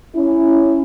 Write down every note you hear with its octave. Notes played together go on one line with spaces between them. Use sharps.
C#4 E4